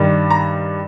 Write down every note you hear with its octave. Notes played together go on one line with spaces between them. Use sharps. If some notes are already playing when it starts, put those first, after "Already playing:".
Already playing: G2 D#3 G3
A#5